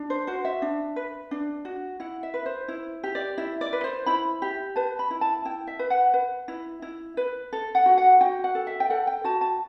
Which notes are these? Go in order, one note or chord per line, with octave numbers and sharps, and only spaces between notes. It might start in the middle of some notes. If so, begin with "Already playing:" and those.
Already playing: D4
C5
F#4 C5
E5
D4
B4
D4
F#4
E4 F#5
E5
B4
C5
E4
G4
D5
E4 E5
D5
B4
C5
E4 B5
G4
B4 A5
B5
E4
A5
E4 G5
E5
B4
F#5
B4
E4
E4
B4
A4
F#5
F#4
F#5
F#4 G5
F#5
A4
E5
G5
A4 F#5
G5
F#4 A5
A5